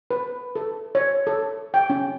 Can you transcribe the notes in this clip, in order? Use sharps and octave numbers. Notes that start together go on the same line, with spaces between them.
B4
A4
C#5
A4
G5
C#4